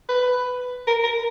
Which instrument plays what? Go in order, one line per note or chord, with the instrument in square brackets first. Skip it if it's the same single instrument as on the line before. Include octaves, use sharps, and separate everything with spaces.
[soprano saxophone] B4
A#4
A#4